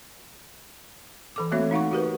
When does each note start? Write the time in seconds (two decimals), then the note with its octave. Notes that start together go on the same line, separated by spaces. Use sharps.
1.36 E3 A4 D6
1.51 A3 A#3 C4 F#4 C#5 E5
1.71 D#4 F5 F#5 C#6
1.92 F#4 G4 A#4 B4